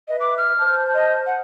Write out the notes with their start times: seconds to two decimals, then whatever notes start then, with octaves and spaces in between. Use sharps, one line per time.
0.08 B4 D#5 E5
0.20 D6
0.38 F6
0.59 C5 A5 G6
0.94 D#5
1.27 F#5